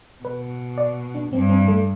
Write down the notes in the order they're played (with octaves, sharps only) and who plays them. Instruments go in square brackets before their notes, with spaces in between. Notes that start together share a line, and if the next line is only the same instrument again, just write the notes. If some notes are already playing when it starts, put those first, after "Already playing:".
[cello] B2 [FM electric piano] B4
[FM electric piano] D5
D4
[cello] G2 [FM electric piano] C4
[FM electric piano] C4
A3